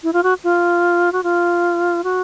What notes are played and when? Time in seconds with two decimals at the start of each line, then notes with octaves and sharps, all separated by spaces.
0.03 E4
0.13 F4
0.23 F#4
0.44 F4
1.12 F#4
1.23 F4
2.04 F#4